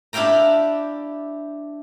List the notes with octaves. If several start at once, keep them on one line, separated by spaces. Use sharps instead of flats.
D4 E4 G4 F5 G5 A#5